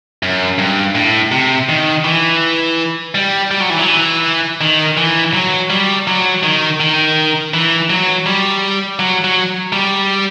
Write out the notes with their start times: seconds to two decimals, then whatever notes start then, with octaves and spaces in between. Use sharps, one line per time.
0.23 F#2
0.58 G2
0.95 A2
1.31 C3
1.69 D#3
2.04 E3
3.15 G3
3.51 G3
3.61 F#3
3.70 E3
3.79 F#3
3.88 E3
4.61 D#3
4.97 E3
5.34 F#3
5.70 G3
6.07 F#3
6.43 D#3
6.80 D#3
7.54 E3
7.90 F#3
8.26 G3
8.99 F#3
9.24 F#3
9.73 G3